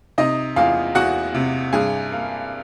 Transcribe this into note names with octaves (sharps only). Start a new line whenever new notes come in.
C3 D#4 D#5
E2 F4 F5
E2 F#4 F#5
C3
G2 G#4 G#5
A#3